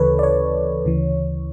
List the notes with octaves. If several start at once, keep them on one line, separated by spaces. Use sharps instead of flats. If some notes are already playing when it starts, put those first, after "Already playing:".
Already playing: D2 C#3 E3 A4 B4 C#5
D5
C#5
D2 C#3 E3